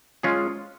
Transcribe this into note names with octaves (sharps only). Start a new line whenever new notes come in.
G#3 C#4 F4 G#4